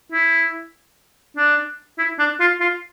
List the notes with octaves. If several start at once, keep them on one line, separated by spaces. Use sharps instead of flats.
E4
D4
E4
D4
F4
F4